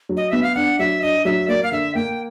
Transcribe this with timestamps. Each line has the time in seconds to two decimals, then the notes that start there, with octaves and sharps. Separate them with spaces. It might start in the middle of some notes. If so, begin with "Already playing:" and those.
0.09 F#3
0.17 D#5
0.30 B3 E5
0.43 F5
0.55 D4 F#5
0.79 F#3 E5
1.02 D4 D#5
1.25 F#3 E5
1.48 A#3 D5
1.63 F5
1.72 D3 E5
1.95 A#3 G5